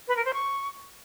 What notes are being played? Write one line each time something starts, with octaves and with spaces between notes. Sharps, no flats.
B4
A#4
C5
C#6